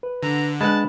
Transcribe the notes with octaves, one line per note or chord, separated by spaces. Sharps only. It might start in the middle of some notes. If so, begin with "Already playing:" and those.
B4
D3 A#5
G#3 D4 B4 F#5 A5 B5